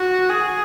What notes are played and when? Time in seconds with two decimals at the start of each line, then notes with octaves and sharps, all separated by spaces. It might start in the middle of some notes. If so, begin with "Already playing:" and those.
Already playing: F#4
0.29 G#4